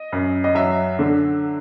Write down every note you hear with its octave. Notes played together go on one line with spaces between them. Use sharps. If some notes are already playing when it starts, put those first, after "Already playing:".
Already playing: D#5
F#2
D#5
F#3 E5
D3